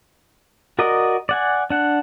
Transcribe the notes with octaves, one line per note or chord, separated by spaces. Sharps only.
F#4 A#4 D5 D#5
D5 F#5 G#5
D4 F#5